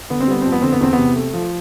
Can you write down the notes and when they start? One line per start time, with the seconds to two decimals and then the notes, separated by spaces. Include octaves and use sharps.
0.10 D3 B3
0.20 C4
0.27 G3 B3
0.41 F2 C4
0.52 B3
0.62 D3 C4
0.72 B3
0.80 E2 C4
0.93 B3
0.98 C3
1.16 A3
1.33 F3